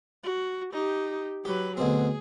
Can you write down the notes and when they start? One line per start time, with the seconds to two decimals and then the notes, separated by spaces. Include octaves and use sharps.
0.23 F#4
0.73 D#4 G4
1.45 F#3 G4 B4
1.77 D2 B2 C4 G#4